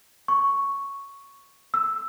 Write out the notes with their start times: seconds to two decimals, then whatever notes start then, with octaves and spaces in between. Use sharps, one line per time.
0.28 C#6
1.74 E6